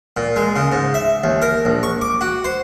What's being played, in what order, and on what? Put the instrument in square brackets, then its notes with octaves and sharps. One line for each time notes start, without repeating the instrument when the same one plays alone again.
[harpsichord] A#2
G#3
C#3
G#2
E5
D#2
A#4
A#1
C#6
D6
F#4
C5